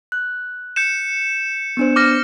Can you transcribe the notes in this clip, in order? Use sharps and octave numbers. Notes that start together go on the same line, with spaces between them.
F#6
G6 C#7 E7
B3 D4 C5
D6 F6 A#6